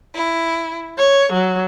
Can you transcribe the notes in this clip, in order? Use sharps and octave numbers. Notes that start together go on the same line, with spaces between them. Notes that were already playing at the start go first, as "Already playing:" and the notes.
E4
C#5
F#3